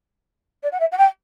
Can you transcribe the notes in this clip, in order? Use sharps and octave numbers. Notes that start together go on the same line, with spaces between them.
D5
F#5
E5
F#5
G5